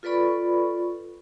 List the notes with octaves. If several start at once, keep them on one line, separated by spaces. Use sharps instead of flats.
F4 A4 B4 D5 B5 C#6